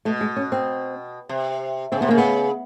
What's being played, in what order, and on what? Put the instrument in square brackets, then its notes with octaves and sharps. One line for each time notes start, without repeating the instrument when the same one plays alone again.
[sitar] B2 [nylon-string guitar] A3
[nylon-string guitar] G#3
C#4
C4
[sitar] C3
[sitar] C#3 [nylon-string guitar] C4
[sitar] C3 [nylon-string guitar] B3
[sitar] C#3 [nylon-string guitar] A#3
[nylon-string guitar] B3